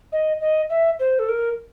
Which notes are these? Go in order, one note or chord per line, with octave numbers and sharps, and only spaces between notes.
D#5
D#5
E5
C5
A4
A#4